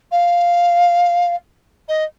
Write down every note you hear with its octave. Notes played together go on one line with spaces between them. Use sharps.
F5
D#5